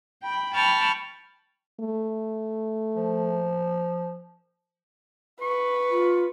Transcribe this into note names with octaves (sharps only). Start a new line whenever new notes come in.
G5 B5
G5 A5 B5 C#6 F6
A3
F3
B4 C#6
F4